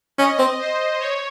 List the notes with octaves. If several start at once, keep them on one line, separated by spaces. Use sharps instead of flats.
C#4 D#5
C4
C5
C#5